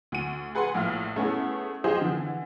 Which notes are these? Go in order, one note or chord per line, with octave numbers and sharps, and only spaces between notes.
D2 D#7
G#4 B4 F#5 G#5 C6
A#1 A2 F5 F6
A3 B3 C#4 E4 G#4
F4 G4 G#4 C5 D#5
D3 E3